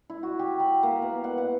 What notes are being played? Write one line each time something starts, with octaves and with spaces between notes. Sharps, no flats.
E4
F#4
G4
B5
A#3
B3
F#5
F#5